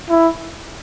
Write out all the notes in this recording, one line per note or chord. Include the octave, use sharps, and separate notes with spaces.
E4